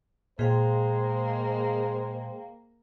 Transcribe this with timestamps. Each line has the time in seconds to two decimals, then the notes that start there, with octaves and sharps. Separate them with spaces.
0.39 A#2 G#3 A#3 G#4 C5 F5 G5